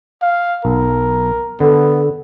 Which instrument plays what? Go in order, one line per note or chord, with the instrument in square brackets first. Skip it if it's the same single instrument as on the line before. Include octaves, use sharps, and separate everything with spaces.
[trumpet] F5
[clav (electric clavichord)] B1 [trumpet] A#4
[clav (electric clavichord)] D3 [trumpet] B3 [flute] A4